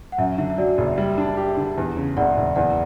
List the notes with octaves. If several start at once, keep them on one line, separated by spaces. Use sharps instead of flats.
F#5
F#2 E5
D3 E5
E5
F#3 D5
F#1
G3 E5
D4
G4
D3
E2
C#3
F#1 D5 F#5
F#1
E2 D5 F#5